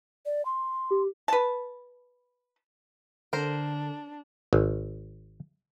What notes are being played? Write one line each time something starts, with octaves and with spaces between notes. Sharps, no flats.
D5
C6
G4
B4 A5
D3 D4 A#4 C5
G#1